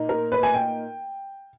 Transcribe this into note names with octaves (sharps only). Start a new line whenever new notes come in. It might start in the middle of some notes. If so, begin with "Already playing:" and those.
Already playing: A#2 A#3 D#4
A#4
B4
G#5
G5